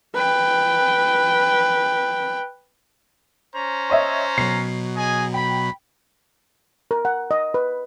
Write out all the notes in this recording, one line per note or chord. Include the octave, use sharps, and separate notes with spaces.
B4 G5
C#4 C5 A#5
C#5 D#5 E5
B2 F#3 C7
G#4 D#5 G#5
G5 B5
A#4
F#5
D#5
B4